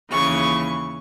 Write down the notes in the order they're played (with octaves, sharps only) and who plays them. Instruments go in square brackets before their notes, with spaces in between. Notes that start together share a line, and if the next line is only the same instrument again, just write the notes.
[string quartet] D#2 C#3 E3 C#6